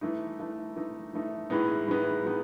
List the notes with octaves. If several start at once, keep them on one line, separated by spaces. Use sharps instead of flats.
E3 A3 D#4
E3 A3 D#4
E3 A3 D#4
E3 A3 D#4
A2 E3 G#3 B3 D#4
A2 E3 G#3 B3 D#4
A2 E3 G#3 B3 D#4